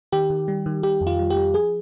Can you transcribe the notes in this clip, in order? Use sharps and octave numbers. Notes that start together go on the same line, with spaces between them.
D#3 G4
D#3
G3
D#3
D#3 G4
F2
F4
G3
G4
G3
F3 G#4